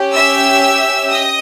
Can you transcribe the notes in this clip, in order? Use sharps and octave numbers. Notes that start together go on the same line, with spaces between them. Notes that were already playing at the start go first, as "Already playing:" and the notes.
Already playing: C#4 G4
E5 E6
D#5 D#6